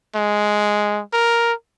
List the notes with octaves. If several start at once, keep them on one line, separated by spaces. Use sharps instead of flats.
G#3
A#4